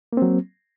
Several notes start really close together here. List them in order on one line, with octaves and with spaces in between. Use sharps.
A#3 C4 F#3